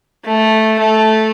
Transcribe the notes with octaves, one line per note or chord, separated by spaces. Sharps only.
A3
A3